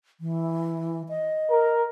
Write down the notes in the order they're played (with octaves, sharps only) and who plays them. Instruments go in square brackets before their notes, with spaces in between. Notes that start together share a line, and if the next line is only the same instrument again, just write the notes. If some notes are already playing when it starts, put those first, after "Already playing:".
[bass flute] E3
D#5
[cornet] A#4